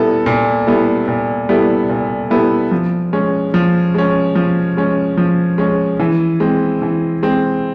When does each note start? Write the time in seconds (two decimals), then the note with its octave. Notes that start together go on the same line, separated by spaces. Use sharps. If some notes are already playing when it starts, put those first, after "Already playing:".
Already playing: A#2 G3 B3 E4 A4
0.26 A#2
0.67 G3 B3 E4 A4
1.08 A#2
1.49 G3 B3 E4 A4
1.89 A#2
2.30 G3 B3 E4 A4
2.71 F3
3.13 G#3 C#4
3.54 F3
3.95 G#3 C#4
4.36 F3
4.77 G#3 C#4
5.18 F3
5.58 G#3 C#4
6.00 E3
6.40 G#3 C4
6.82 E3
7.23 G#3 C4